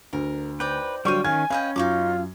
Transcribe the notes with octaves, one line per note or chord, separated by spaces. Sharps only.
D2 A#4
D#4 B4 C5 D5 G5
D3 F#3 G3 F4 F5 G5 C#6 D#7
D#3 C#4 F5 G#5 G#6
C#4 B4 D#5 F5 G5
F#2 D#4 F4 C#6 D6